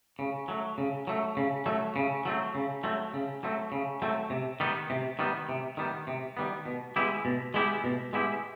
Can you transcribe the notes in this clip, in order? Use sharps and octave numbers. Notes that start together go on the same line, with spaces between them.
C#3
F#3 A3
C#3
F#3 A3
C#3
F#3 A3
C#3
F#3 A3 C4
C#3
F#3 A3 C4
C#3
F#3 A3 C4
C#3
F#3 A3 C4
C3
D#3 G3 B3
C3
D#3 G3 B3
C3
D#3 G3 B3
C3
D#3 G3 B3
B2
G#3 B3 E4 G4
B2
G#3 B3 E4 G4
B2
G#3 B3 E4 G4